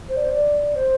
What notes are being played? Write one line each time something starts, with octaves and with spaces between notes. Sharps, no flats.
C5
D5
C5
D5
C5